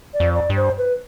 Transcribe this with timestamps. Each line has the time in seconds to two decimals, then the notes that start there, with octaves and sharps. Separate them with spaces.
0.14 D5
0.20 F2
0.35 D5
0.50 G2
0.56 C5
0.78 B4